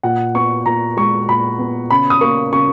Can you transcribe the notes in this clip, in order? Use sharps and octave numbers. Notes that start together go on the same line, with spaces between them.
A#2 F#5
B3 C#6
A#2 A#5
G#3 C#6
A#2 B5
B3
C#3 B5
D#6
A#3 C#6
C#3 C#6